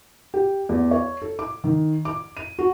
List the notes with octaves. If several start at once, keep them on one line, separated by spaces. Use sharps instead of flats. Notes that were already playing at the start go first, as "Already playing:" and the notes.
G4
E2
C#5
A4
D6
D#3
D6
D#7
F#4